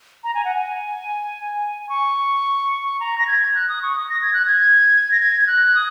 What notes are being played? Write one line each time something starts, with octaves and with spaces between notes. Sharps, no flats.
A#5
G#5
F#5
G#5
C#6
A#5
A#6
G#6
F#6
D#6
C#6
D#6
A#6
G#6
F#6
G#6
A#6
G#6
G#6
F#6
D#6